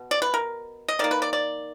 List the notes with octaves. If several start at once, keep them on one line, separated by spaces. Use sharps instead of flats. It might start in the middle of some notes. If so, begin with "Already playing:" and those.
Already playing: B2
D5
B4
A#4
D#5
D#3 A#3 D5
B4
D5
D5